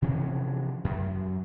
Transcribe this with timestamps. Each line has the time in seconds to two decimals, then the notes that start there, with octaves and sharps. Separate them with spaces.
0.02 C3 E3 F3 C#4
0.84 F#2